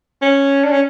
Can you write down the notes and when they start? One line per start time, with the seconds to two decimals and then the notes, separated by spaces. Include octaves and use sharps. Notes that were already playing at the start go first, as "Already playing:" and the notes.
0.22 C#4
0.64 D4
0.72 C#4